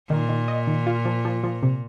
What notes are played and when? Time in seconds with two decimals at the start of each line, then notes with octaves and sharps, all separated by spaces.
0.10 A#2 D#3
0.29 D#3
0.48 D#5
0.67 D#3
0.87 F4
1.05 F3
1.25 F3
1.44 F3
1.63 C3